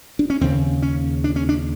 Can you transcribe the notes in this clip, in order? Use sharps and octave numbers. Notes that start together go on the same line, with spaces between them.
D4
C#4
D#2 C#3 C4
C#4
D4
C#4
D4